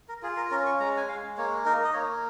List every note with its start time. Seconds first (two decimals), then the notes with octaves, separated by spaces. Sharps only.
0.09 A#4
0.23 F4 G#4
0.37 A#4
0.51 C#4 A#4
0.66 C#6
0.80 G#3 A#5
0.97 G#5
1.08 G#3 F5
1.38 A#3 C#5
1.66 D#4 A#4
1.85 D#5
1.94 A#3 C#5